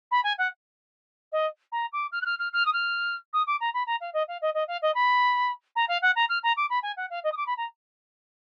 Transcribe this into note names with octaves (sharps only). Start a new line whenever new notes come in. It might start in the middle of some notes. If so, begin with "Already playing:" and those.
B5
G#5
F#5
D#5
A#5
D6
F6
F#6
F6
F6
F6
D#6
F6
D#6
D6
A#5
B5
A#5
F5
D#5
F5
D#5
D#5
F5
D#5
B5
A#5
F5
F#5
A#5
F6
A#5
D6
B5
G#5
F#5
F5
D#5
D#6
D6
B5
A#5